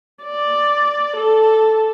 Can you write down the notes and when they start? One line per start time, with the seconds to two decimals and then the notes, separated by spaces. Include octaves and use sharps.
0.22 D5
1.16 A4